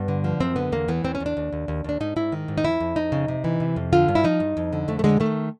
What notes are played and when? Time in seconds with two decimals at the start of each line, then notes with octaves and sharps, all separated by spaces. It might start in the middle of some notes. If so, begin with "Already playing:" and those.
Already playing: G2 B3
0.08 D3
0.24 F3
0.40 F#2 C4
0.56 D3 B3
0.72 E2 A#3
0.88 E3 B3
1.04 E2 C4
1.15 C#4
1.20 E2
1.26 D4
1.37 D#2
1.52 D#2
1.68 D#2
1.84 D#2 D4
2.00 G#2 D#4
2.16 G#2 E4
2.32 D#3
2.48 G#2
2.58 D#4
2.64 F2 E4
2.80 F2
2.96 F2 D#4
3.12 C#3
3.28 C3
3.44 E3
3.60 C3
3.76 F2
3.92 D3 F4
4.08 G2
4.15 E4
4.24 F3 D#4
4.40 G2
4.57 F2
4.73 D3
4.88 F2 A3
4.99 A3
5.04 D3 G#3
5.20 D#3 A3